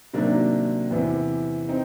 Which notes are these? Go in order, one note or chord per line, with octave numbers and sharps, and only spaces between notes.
C3 D#3 F#3 A#3 D4
E2 C3 E3
C4 D#4